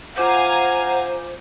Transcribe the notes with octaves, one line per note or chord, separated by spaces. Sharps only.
F4 C5 F5 F#5 G#5 A#5 D6 G6